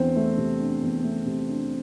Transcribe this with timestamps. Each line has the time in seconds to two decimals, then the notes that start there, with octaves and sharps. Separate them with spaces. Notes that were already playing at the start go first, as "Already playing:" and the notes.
Already playing: E2 C4 D4
0.16 A3
0.38 C3
0.60 D4
0.82 E2
1.04 A3
1.26 C3
1.49 D4